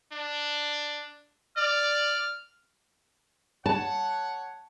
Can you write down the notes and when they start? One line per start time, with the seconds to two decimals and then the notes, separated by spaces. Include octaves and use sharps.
0.13 D4
1.57 D5 F6
3.66 C#5 F#5 A5